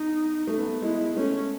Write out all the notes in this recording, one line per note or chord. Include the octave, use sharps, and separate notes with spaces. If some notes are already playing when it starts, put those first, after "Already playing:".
Already playing: B3 D#4
A3
B3
A3
G#3 E4
A3 C#4